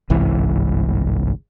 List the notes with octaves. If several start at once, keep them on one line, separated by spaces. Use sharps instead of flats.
G1 C2 G#2 E3